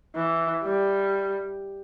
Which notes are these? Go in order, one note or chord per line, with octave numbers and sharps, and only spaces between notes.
E3
G3